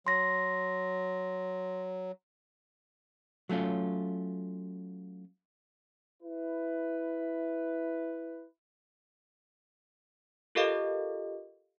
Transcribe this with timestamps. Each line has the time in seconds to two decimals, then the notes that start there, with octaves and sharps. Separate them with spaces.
0.07 F#3 C6 A#6
3.49 F#3 A3 C#4 F4
6.22 E4 B4
10.55 F4 G4 A4 A#4 D#5 F5